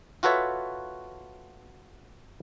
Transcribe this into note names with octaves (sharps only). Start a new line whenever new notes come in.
F4 F#4 A4 B4 C#5 E5